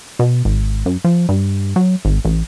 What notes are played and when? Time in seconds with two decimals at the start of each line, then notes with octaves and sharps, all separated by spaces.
0.19 B2
0.45 G#1
0.86 F#2
1.04 F3
1.29 G2
1.76 F#3
2.05 G#1
2.25 A1